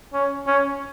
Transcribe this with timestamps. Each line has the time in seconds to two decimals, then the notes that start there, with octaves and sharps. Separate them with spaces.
0.14 C#4
0.47 C#4